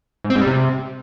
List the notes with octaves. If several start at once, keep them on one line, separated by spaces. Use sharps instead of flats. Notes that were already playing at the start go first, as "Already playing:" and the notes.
G#2
C4
G#2
G3
C3